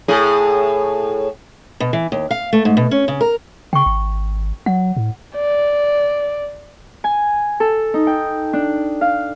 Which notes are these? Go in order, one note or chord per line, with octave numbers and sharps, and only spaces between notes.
A2 G#4
B2
E3
D#2
F5
A3
G#2
B2
C#4
C#3
A#4
C#3 G5 C#6
G#1
F#3 F#5
A2
D5
G#5
A4
D#4
G5
D4
F5